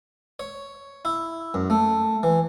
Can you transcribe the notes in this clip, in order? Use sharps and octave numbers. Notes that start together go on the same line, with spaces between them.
C#5
E4
F#2
A3
E3